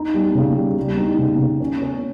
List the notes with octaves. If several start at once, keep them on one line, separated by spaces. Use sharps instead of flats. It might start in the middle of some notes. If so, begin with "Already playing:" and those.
Already playing: D#4
G3
C#3
G3
G3
D#4
C#3
C#3
C#4
C#4